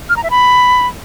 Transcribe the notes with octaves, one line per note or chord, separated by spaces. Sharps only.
F6
A#5
E5
B5